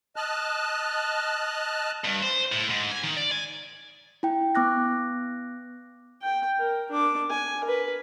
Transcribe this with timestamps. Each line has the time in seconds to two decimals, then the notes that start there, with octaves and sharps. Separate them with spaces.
0.16 D#5 A5 F6 F#6
2.04 G2
2.22 C5
2.52 A2
2.70 G#2
2.92 G#5
3.03 D#3
3.17 D5
3.31 G#5
4.23 E4 G5
4.55 B3 D6 F#6 A#6
6.22 G5
6.59 A#4
6.91 D4 D6
7.29 G#5
7.64 A#4 B4